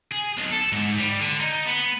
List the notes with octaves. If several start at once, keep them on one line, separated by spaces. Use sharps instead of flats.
G#4
B1
A4
G#2
G3
D3
D#4
B3